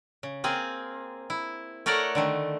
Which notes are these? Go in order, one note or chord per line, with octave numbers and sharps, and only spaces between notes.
C#3
A#3 C4 G#4
E4
A3 A4 A#4 C#5 D5 F#5
D3 D#3 A3